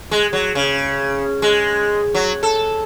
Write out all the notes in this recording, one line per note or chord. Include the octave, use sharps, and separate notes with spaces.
G#3
F#3
C#3
G#3
F#3
A4